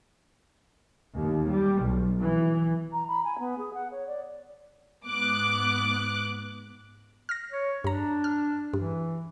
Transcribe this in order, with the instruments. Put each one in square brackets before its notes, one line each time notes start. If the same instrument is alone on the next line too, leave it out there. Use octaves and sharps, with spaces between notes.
[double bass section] D#2
G3
B1
E3
[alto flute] A#5
B5
G#5
B3
G#4
F#5
C#5
D5
[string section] G#2 B3 D6 F#6
[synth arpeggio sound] F6 A#6
[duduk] C#5
[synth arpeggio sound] G2 A#5 [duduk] D4
[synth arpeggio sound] F6
[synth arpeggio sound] G2 [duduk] E3